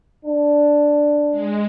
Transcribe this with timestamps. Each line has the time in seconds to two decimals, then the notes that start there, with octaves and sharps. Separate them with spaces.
0.25 D4
1.31 G#3